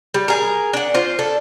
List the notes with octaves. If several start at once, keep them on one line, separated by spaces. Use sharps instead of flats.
G3
G#4 A#4
D4 F#5
F4 C5
D4 A4